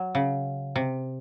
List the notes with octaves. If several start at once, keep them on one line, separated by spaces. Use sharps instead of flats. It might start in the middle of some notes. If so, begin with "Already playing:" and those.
Already playing: F#3
C#3
C3